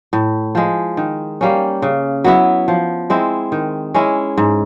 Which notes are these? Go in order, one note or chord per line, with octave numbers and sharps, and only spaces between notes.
A2
F3 G#3
D#3
G3 A#3 C#4
C#3
F#3 B3 E4
F3
G#3 C4 E4
D#3
G#3 C#4 E4
G#2